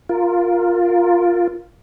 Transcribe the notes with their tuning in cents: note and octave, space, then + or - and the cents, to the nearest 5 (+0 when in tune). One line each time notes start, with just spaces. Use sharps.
F4 +5 A#4 +0